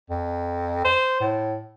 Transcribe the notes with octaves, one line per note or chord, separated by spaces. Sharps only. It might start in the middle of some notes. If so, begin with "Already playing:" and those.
F2
C5
A2